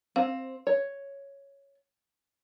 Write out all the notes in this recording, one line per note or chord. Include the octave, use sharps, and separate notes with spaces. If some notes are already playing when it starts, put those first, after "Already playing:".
C4 F5
C#5